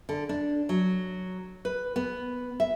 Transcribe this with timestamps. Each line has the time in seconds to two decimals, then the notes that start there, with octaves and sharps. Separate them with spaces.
0.09 D3
0.29 D4
0.69 F#3
1.65 B4
1.96 B3
2.60 E5